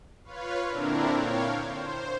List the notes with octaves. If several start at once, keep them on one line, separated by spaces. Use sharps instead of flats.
F4 B4 C#5 F5
A#2 D3 C4 D4 E4 A#4
C#5 F5 G5
C5